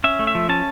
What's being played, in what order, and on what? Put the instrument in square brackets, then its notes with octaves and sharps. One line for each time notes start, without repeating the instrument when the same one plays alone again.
[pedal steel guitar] C#4 E5
A3
E5
F3
C#4 A5